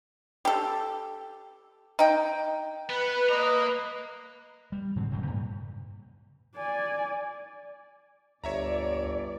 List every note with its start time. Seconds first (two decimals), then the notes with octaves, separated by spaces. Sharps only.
0.45 G4 A4
1.99 D#4 G5
2.90 B3 B4
3.29 A#3 D#5 A#5
4.72 G3
4.96 G#2 D3 E3 C4
5.11 E1 D2 C#3 F#3
5.26 G2 A#2
6.56 D5 G#5
8.44 G1 D2 C#5 D5 E5 A#5